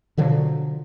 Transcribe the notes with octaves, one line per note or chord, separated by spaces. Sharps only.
B2 D3 F3 F#3